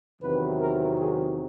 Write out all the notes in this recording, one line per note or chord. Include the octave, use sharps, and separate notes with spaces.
E2 C3 D#3 F#3 B4
A#4
G#4